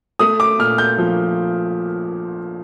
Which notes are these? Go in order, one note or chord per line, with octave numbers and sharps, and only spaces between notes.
A3 D#6
D6
A#2 F6
G6
F3